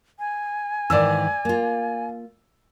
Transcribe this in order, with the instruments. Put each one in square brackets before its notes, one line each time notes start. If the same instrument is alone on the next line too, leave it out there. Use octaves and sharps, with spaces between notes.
[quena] G#5
[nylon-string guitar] G#2 D#3 E3 [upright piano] D5 E6
[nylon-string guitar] A#3 F4